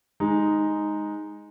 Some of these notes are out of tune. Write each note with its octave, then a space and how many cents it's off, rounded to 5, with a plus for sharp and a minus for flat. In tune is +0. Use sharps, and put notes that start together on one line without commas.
G#3 +0 D#4 +0